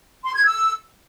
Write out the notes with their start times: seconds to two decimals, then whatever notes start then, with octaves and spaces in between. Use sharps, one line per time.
0.24 C6
0.35 G#6
0.46 E6